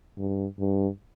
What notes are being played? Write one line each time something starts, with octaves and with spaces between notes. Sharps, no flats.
G2
G2